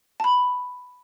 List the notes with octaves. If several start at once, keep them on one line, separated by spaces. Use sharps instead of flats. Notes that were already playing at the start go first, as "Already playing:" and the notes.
A5 B5